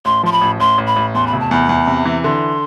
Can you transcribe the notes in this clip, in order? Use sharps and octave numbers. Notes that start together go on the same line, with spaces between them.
A1 C6
F3 C6
B5
A1
A1 C6
A1
B5
A1
E2 C6
B5
F1
A5
E2 B5
E2
C3
E3
D3 C6